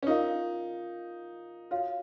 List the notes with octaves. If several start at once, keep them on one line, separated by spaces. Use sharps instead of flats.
C#4
D#4 F4 A#4 F5
F4 F#4 C#5 F5